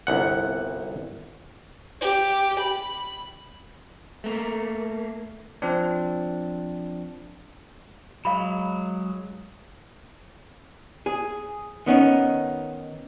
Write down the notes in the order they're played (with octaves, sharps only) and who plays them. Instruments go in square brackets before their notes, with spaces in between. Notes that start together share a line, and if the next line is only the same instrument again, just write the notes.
[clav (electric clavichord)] G1 C2 F#5
[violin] G4
B5
[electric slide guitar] A3 A#3
[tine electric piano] F3 C4 D4
[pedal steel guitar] F#3 G#3 [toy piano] F5 B5
[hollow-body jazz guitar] G#4
D#3 B3 C#4 D#4